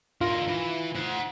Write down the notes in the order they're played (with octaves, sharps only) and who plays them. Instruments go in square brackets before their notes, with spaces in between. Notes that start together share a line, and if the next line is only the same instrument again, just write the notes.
[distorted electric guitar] D3 A#4 [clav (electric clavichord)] F4
[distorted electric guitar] E3
C5 F#5